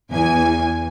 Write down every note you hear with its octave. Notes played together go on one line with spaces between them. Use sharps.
E2 G#5